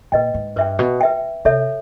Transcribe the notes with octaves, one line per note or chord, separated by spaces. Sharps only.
A#2 B4 D#5 G5
G#2
G2 B4 E5 G5
B2
B4 E5 G5
C3 A4 C#5 E5